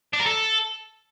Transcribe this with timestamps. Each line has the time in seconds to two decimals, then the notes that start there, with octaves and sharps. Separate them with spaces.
0.13 D4
0.20 A#4
0.26 A4